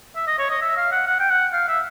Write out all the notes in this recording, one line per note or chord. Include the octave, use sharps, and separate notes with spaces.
E5
D#5
C#5
D#5
E5
F5
F#5
F#5
G5
F#5
F5
E5